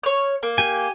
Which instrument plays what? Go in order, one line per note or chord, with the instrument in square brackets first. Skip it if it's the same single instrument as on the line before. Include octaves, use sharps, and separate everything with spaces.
[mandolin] C#5 F6
A#3
[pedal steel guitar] G4 G#5